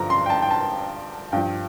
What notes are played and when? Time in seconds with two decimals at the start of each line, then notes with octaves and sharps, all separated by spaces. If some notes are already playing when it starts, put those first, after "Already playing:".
Already playing: G2 D3 F3 A#5
0.10 C6
0.26 G5
0.30 A5
0.42 G5
0.51 A5
1.32 G2 F3 G5